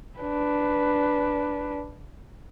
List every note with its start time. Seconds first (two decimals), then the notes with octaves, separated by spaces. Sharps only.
0.19 D4 B4